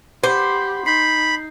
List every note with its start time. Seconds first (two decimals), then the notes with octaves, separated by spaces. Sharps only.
0.24 G4 C5 F#5 B5 D6 G6
0.86 D#4 B5 G6 C7